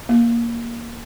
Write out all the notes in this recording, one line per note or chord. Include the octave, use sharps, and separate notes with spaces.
A#3